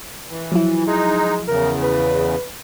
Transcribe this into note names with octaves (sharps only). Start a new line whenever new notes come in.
E3
F3 F#3 E4
G#3 D#4
E2 C#3 A#4
B4